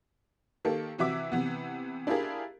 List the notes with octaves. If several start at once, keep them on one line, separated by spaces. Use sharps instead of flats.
D#3 A#3 G4 A4
C3 E3 F#4 E5 D6
C3 E3 B3
D4 E4 F4 G4 G#4 A#4